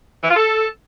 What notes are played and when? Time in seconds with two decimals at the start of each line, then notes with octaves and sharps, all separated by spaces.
0.24 E3
0.30 F4
0.36 A4